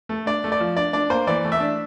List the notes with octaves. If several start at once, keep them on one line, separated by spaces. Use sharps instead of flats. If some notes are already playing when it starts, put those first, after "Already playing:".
A3
D4 D5
A3
D5
F3
D4 D5
D4 D5
A#3 C5
E3 D5
A3
E5
D4